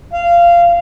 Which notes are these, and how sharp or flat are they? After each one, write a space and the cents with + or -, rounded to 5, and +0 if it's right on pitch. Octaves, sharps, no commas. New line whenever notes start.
F5 -20